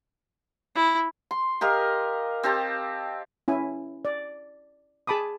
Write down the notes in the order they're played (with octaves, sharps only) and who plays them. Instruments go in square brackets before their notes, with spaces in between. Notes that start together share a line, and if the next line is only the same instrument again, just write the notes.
[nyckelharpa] E4
[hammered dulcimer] C6
G4 A#4 D#5 F5
C4 G4 A5
[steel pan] C#4 E4 G#5
D5
G#4 A5 B5 D6 D#6